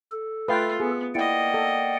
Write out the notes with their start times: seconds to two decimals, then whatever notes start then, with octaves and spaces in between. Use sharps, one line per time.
0.12 A4
0.48 A3 F4 B4 F5 G5
0.80 B3 G#4
1.15 A#3 E4 D5 D#5 F#5 G5
1.54 A4